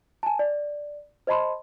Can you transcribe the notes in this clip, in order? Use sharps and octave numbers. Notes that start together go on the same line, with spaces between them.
G#5 A5
D5
C5 D#5 A5 B5 C6